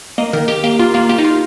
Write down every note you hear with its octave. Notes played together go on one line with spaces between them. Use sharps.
A#3 D#5
D#3 A#4
D#3 G4
A#3 G4
A#3 F4
A#3 F4
A#3 G4
D#4
F4